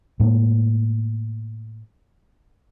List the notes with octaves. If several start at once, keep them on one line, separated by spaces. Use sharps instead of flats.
A2 G#3 A#3